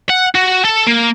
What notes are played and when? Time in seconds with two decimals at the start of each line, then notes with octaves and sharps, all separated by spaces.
0.09 F#5
0.35 F#4
0.65 A4
0.87 A#3